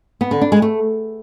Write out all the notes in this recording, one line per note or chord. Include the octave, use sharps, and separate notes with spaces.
B3
D3
D4
G#3
A3